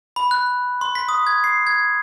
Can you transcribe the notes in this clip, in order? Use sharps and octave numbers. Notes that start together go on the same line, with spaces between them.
B5
F#6
C6
B6
D#6
G#6
C7
G#6